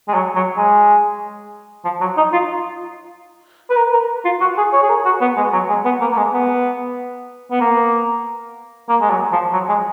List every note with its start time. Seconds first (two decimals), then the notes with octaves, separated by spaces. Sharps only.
0.08 G#3
0.14 F#3
0.35 F#3
0.57 G#3
1.85 F3
2.01 F#3
2.17 D#4
2.33 F4
3.70 B4
3.77 A#4
3.93 A#4
4.25 F4
4.41 F#4
4.58 G#4
4.73 C#5
4.83 G#4
4.89 A#4
5.05 F#4
5.21 B3
5.37 G#3
5.53 F#3
5.69 G#3
5.85 B3
6.01 A#3
6.12 A#3
6.17 G#3
6.33 B3
7.51 B3
7.61 A#3
8.89 A#3
9.01 G#3
9.10 F#3
9.32 F3
9.53 F#3
9.69 G#3